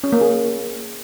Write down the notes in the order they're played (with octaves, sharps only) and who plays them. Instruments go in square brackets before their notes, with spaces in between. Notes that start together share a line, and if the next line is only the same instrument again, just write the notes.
[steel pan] C#4
A#3
G#4